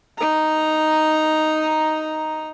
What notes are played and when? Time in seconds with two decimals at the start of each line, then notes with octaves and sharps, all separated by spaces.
0.18 D#4 A#5